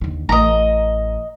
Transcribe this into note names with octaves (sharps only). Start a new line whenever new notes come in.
D#2 D3
A1 D#5 A#5